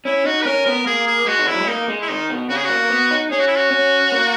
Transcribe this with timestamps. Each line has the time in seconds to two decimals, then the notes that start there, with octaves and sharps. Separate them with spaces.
0.05 C#4 E4
0.25 D#4 F#4
0.42 B4
0.46 C#4 A#4
0.66 B3 A#4
0.86 A#3 G#4
1.07 G#4
1.27 G#3 F#4
1.39 D#3
1.47 E3 E4
1.53 F#3
1.61 G#3
1.67 A#3 D#4
1.89 G#3
2.01 E4
2.08 D#3 D#4
2.29 B2
2.49 C#3 F#4
2.57 G#4
2.64 F#4
2.69 A#3
2.91 B3
3.11 D#4
3.31 C#4 G#4
3.39 F#4
3.47 E4
3.56 F#4
3.71 C#4
4.11 A#3